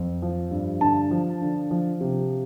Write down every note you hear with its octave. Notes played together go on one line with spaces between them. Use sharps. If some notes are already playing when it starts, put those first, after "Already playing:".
Already playing: F2
F3
G2
D3 A5
F3
D3
F3
C3